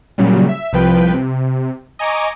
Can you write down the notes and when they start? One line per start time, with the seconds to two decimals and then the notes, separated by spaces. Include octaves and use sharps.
0.18 A#2 C#3 F#3 G3
0.49 E5
0.73 C2 F3 B4 G5
1.14 C3
1.99 D#5 G#5 A#5 C#6 D6